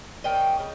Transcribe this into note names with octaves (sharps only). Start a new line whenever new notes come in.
F3 A#3 C#4 D#5 G5
C#3